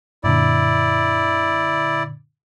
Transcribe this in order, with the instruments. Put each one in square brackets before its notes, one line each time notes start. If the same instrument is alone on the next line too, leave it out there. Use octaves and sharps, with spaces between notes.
[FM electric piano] F#2 A#2 D3 [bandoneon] E4 D5